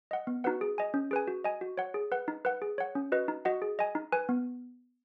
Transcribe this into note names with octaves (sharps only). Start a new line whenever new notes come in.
D#5 F#5
B3
D#4 F#4 B4 F#5
G#4
D#5 G#5
C#4
G#4 B4 G#5
F#4
D#5 G#5
F#4
C#5 F#5
G#4
B4 F#5
D#4
B4 F#5
G#4
C#5 F#5
C#4
F#4 B4 D#5
D#4
F#4 D#5 F#5
G#4
D#5 G#5
D#4
B4 G#5
B3